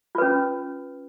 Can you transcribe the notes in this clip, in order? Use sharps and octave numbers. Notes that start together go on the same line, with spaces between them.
C#4 F4 B4